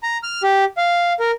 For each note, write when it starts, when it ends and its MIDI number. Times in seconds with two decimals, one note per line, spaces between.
0.03 0.18 82
0.23 0.42 89
0.43 0.64 67
0.77 1.13 77
1.20 1.31 70